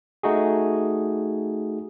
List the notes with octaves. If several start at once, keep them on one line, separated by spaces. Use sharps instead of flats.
A3 D#4 F#4 G#4